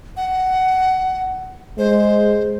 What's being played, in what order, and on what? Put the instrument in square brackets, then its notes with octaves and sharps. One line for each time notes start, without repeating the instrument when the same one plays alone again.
[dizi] F#5
[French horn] G#3 [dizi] C5